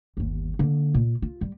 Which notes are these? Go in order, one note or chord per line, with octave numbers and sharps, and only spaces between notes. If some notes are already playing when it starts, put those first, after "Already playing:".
G1 D#2
D3 A#3
A#2
F4
G3